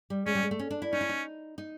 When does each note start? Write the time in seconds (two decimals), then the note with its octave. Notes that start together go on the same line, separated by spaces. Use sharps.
0.10 G3
0.26 G#3 C#4
0.35 G3
0.43 G#3
0.51 A3
0.59 C#4
0.71 D4
0.82 E4
0.93 C#4 D#4
1.01 E4
1.09 D#4
1.58 D#4